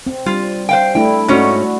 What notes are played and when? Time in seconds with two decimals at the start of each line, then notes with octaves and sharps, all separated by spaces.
0.07 C4
0.26 G3 F4
0.69 C5 F5 G5
0.95 A3 D4 E4 G5
1.28 G#2 A3 C#4 D4 F#4 C#5